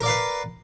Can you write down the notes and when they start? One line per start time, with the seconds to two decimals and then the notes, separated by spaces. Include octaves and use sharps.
0.01 A#4
0.03 D5
0.06 F5
0.08 B4